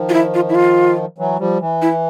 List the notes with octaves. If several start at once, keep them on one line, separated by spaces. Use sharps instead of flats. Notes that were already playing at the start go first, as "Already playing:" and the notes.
Already playing: D#3 F3
F4
E4
F4
E4
F4
E3 F#3
F3 G3
E3
E4